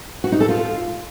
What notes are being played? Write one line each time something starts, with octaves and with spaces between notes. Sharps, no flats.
F#4
D#4
A4
F4